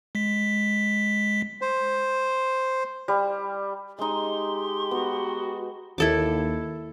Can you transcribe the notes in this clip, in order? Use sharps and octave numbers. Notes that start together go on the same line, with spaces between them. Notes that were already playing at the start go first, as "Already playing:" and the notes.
G#3 B6
C5
G3
G#3 D#4 G4 C6
B3 F#4
D#2 E4 A4 D6